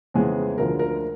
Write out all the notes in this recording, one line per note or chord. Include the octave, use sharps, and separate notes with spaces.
F2 C#3 E3 G#3 B3 G#4
D2 D3 F3 A#4
A#4